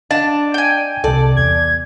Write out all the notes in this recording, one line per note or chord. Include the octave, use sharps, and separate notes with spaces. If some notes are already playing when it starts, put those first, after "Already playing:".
D4 D#5 F5 A5
G5 G#5
C2 C3 A4 D5
E2 G#6